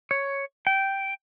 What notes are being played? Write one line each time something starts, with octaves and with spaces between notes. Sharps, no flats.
C#5
G5